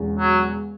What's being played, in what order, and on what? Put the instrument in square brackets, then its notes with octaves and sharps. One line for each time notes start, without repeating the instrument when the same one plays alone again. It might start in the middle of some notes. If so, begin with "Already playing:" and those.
Already playing: [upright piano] E1 E2 C#3
[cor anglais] F#3